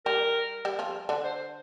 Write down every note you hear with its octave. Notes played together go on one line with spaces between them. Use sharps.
G3 G4 A#4
G3 G4
F3 F4
D3 D4
C5